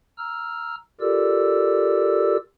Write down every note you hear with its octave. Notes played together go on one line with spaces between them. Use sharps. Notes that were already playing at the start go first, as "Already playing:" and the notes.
A#5 E6 F6
F4 G4 A4 A#4 D5 E6